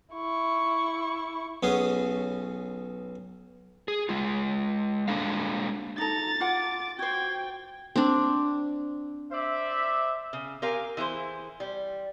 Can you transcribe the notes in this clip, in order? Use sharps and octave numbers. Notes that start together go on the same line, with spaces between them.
E4 C#6
B1 B3 C#4 G#4
G#4
G#3 F4
G#3 A#3 D4 A4 F5
D#4 A4 A#5 A6
F4 F#5 D6
F#4 C5 G5 G#6
C4 D4
C5 D5 E5
C#3
G4 A#4 F5 G#5
E3 E4 G#4 C5
G3